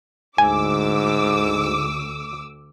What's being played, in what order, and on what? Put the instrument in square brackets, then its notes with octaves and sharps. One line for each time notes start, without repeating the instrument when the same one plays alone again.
[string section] D2 D6 E6 [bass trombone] G#2 [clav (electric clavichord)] G#5